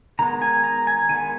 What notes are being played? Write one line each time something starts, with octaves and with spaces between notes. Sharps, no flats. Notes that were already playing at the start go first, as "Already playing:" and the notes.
D#3 G#3 B3 A#5
G#5
A#5
G#5
D#3 G#3 B3 G#5